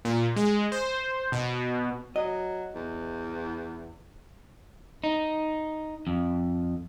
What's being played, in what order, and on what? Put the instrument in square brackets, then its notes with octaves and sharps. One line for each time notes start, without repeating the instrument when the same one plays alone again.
[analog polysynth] A#2
G#3
C5
B2
[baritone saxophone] F#3 [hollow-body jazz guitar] D#5
[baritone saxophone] E2
[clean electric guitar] D#4
F2